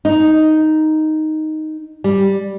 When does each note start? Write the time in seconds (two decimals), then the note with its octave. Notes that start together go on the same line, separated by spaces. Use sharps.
0.05 D#4
2.04 G3